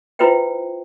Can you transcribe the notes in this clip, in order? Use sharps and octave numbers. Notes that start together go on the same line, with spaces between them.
E4 F4 B4 C5 E5 G5